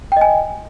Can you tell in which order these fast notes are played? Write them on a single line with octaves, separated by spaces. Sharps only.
G5 D#5 G#5